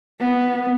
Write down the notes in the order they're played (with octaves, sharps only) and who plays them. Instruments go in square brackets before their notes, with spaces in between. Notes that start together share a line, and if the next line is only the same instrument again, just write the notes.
[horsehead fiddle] B3